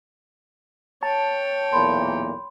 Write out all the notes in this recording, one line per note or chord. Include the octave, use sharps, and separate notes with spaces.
C#5 G5 A5
B1 E2 A#2 B5 C6